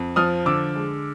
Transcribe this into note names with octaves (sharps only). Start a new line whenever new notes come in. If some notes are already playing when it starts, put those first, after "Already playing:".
Already playing: F2
F3 D#6 F6
D3 D6 E6
G#3